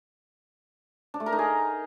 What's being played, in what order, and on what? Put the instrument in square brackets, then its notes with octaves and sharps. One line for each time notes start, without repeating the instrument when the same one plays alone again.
[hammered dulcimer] D4
A3
A#4
D#4
G#4